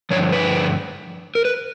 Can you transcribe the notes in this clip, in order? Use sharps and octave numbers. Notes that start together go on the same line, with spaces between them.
G2 D3 F3 C#5
B4
A#4
B4